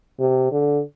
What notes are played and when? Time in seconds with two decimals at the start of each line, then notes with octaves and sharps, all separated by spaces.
0.20 C3
0.52 D3